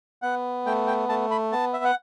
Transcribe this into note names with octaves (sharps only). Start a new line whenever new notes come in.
B3 F#5
A3 G5
G5
A3 A5
B5
B3 A5
E5
F#5